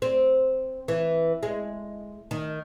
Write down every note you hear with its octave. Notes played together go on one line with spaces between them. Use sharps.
C4
E3
G#3
D#3